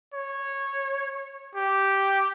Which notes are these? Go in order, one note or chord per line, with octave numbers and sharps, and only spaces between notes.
C#5
G4